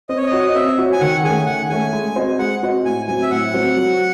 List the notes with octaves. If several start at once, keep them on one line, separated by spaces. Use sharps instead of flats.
C4 D#5
C#5
D#5
F#4 C#5
D#5
C4 E5
F#4 C#5
G#5
D#3 F#5
A3 C#4 G#4 G#5
D#3 F#5
A3 C#4 G#4 G#5
G#3
C4 F#4 C5 D#5
G#3 F#5
C4 F#4 C5 D#5
A2 G#5
F#3 C4 G#5
E5
A2 F#5
F#3 C4
F#3